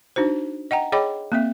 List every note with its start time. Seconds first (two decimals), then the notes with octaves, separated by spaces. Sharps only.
0.16 D4 D#4 F#4 C5
0.71 D#5 F#5 G5 A#5
0.92 G#4 C#5 D#5 G5 B5 D6
1.32 A#3 C4 E5